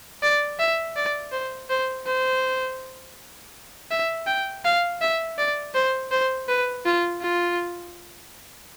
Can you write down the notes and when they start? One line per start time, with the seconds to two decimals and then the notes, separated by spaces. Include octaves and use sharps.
0.23 D5
0.59 E5
0.96 D5
1.32 C5
1.70 C5
2.06 C5
3.91 E5
4.27 G5
4.65 F5
5.01 E5
5.38 D5
5.75 C5
6.12 C5
6.49 B4
6.86 F4
7.22 F4